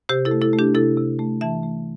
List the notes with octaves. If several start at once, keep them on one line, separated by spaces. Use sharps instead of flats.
C3 G4 C5
E4 A4
A3
E4 A4
A3
D4 G4
C3 E4 A4
C3
A3
E3 E5 A5
A3